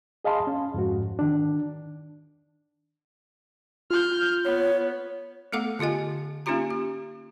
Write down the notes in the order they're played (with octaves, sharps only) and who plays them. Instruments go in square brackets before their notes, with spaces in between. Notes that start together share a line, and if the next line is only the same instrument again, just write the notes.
[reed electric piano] G#4 D#5 F5 A5 B5 C6
C#4
F2 G#2 F#4
D#3 D4
[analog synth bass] F4 [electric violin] F6 G6
[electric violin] B3 [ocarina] C#5
[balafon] A3 B3 A4 F5 F#5 D6
D3 F4 G4 D#5 G#5
A#3 C#4 D#4 F4 G4 A#5
G4